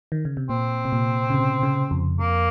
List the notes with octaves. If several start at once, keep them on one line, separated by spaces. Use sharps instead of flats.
D#3
C#3
C3
A#2 C4
C3
A#2
C#3
C3
C#3
F2
F2 A#3